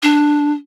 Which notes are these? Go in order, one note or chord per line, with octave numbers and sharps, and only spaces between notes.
D4